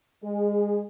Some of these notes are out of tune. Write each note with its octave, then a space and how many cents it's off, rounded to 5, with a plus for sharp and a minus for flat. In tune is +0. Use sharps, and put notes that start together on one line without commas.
G#3 -25 G#4 +0